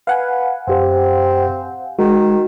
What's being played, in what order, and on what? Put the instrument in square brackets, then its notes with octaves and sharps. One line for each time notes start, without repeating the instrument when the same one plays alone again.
[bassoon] B4 [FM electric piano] F5 F#5 G#5
[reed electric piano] F#2 G4 C5 [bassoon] C4
[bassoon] D#3 [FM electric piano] G#3 [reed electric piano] F#4